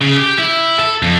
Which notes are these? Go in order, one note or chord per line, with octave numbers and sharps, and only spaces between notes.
C#3
G4
E4
A4
F2